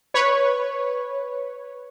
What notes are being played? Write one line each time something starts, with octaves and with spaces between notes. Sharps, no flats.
B4 C#5